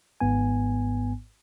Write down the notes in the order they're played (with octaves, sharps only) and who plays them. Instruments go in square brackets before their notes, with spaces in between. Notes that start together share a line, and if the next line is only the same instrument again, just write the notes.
[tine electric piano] G#1 G#2 B3 G#5